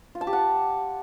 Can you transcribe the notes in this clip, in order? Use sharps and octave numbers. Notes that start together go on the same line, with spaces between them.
F4
A5
G4
F#5